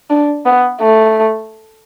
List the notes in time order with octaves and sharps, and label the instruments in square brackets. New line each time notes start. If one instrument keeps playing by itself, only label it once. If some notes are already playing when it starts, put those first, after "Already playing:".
[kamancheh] D4
B3
A3